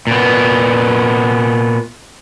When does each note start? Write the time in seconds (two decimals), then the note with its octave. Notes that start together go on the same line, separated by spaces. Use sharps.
0.07 A#2 B3